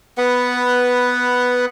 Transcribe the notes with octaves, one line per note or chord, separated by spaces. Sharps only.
B3 B4 F#5